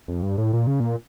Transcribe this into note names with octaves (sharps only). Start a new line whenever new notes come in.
F2
G2
A2
A#2
C#3
A#2